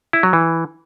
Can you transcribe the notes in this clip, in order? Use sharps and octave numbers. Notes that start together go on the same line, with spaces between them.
E4
F#3
E3